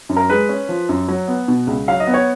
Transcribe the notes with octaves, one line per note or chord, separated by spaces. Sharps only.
F#2
A#4
G#3 B4
C#4
F3
F#2
F#3
B3
B2
C#2
F#3 F5
D#5
B3
C#5